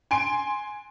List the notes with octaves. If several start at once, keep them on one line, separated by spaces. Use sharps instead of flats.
G#5 C6 D7